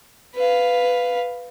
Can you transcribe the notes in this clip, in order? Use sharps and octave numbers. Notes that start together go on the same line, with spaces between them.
B4 F5